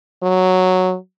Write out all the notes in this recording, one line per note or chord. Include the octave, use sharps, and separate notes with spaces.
F#3